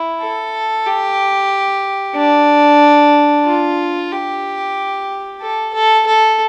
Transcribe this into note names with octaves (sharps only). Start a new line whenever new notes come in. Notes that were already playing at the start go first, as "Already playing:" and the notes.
Already playing: E4
A4
G4
D4
F4
G4
A4
A4
A4